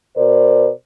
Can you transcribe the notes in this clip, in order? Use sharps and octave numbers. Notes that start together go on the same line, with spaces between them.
B2 A#4 C5 D5